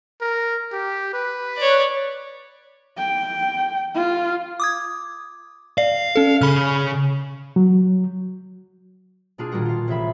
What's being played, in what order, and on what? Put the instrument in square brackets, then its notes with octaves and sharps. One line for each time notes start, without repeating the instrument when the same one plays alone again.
[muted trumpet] A#4
G4
B4
[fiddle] C#5 D5
[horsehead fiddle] G5
F4
[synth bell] D6 D#6 G#6
[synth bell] D5 [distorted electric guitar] F5
[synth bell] C#4 A4
[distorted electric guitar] C#3 [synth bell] B5 F6
[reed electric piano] F#3
[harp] B2 A#3 D4 F4 G#4
A#2 D#3 G3 F#4 A#4
F4 F5
A1 C3 G#4 E5 B5